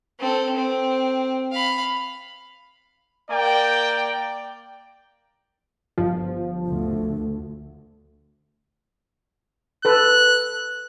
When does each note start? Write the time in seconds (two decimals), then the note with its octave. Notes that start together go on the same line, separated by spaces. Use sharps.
0.20 C4 A4
0.56 C4
1.52 F5 B5
3.30 A#3 A#4 D5 G5
5.98 G1 F3
6.68 D2
9.85 A4 B4 F#6